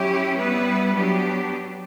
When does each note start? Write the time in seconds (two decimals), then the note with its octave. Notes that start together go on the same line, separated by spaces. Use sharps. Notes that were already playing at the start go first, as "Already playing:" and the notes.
Already playing: F#3 C#4 E4 G4
0.37 G3 B3 E4 B4
0.95 F#3 B3 D4 G4